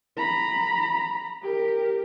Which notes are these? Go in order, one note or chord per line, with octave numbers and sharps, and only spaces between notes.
A#5 B5
G4 A#4